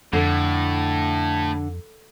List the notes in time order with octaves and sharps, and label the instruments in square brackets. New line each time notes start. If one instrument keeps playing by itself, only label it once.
[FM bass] F2 [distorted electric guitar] A2 [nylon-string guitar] D3